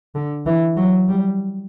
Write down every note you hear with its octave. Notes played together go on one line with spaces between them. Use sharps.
D3
E3
F#3
G3